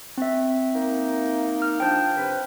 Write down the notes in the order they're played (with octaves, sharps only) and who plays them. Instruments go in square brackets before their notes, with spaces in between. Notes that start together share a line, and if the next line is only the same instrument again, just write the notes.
[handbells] C4 E5
[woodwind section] A#3 D#4
[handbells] F6
[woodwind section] F3 D4 [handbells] G5 G6
[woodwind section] C3 B4